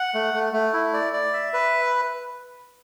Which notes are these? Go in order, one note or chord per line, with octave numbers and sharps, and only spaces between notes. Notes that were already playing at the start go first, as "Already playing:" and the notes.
Already playing: F#5
A3
A3
A3
E4
D5
D5
E5
B4